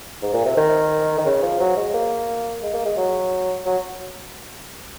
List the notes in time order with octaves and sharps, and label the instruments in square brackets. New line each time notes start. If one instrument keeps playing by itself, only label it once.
[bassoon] G#2
A#2
C3
D#3
D#3
C#3
F3
F#3
G#3
A#3
G#3
A#3
G#3
F#3
F#3